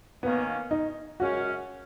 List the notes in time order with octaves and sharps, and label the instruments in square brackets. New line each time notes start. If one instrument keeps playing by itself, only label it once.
[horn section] D#3 A#3 C#4 [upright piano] B3
[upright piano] D#4
[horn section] F#2 C#3 G#3 C#4 [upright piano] F#4